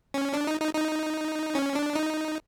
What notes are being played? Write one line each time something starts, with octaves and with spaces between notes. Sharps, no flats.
C#4
D4
D#4
D#4
D#4
C#4
D4
D#4